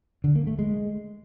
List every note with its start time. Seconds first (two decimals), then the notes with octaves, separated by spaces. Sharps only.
0.24 D3
0.36 A#3
0.47 A3
0.59 G#3